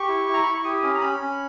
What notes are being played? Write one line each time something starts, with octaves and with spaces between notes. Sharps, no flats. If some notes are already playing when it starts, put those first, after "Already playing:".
Already playing: G4 C#6
E4
E4
A#5
E4 B5
C#6
G4 D#6
C#4 D#6
A#5
C#4 B5
C#4